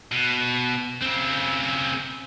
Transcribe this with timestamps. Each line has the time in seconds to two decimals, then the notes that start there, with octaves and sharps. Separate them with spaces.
0.12 B2
1.03 C#3 C4